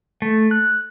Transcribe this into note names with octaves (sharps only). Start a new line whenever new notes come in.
A3
F#6